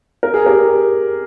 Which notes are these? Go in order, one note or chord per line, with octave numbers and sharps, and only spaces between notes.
A#4
G#4
G4 A#4